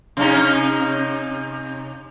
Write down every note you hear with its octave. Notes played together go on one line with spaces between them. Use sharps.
C3 C#4 D#4